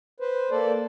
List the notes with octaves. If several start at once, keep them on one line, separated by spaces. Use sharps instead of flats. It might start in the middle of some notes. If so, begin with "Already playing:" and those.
B4 C5
A#3 A4 D5